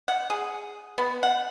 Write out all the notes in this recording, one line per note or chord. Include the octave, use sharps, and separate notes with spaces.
F#5
G#4
B3
F#5